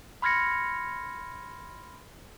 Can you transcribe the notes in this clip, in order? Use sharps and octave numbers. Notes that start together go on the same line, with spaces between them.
B5 C6 F6 G#6 A#6 C#7